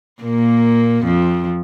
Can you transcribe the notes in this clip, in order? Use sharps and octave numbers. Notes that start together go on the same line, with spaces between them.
A#2 A#3
F2 F3